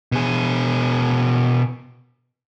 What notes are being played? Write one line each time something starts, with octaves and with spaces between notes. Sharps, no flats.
B2 G#4